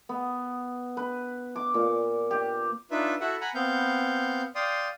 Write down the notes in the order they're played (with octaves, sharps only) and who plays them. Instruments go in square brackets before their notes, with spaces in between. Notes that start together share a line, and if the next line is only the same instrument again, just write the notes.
[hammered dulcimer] B3
B4
D6
A#2
G4
[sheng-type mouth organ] D4 D#4 F4 B4 E5
E4 F#4 A4 E5 F#5
F#5 G#5 A#5 B5
B3 C4 F5 G6
D5 F5 G5 C6 D#6